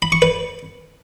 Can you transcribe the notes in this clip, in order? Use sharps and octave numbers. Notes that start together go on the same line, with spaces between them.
B5
C#6
B4